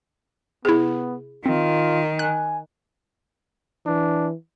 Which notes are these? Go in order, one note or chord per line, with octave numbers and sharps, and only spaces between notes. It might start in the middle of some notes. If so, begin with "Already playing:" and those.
C3 B3 E4 G#4
D#3 C4 F4
G#5 F#6
E3 D4